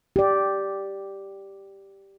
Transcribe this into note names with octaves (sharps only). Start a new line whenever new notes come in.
G4 D5